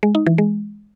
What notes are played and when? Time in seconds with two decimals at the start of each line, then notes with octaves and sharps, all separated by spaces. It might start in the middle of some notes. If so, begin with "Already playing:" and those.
0.03 G#3
0.15 D#4
0.26 E3
0.38 G#3